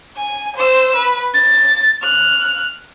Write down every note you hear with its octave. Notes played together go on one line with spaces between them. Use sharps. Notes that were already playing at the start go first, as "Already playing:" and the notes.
G#5
C5 E6
B4
A6
F6 F#6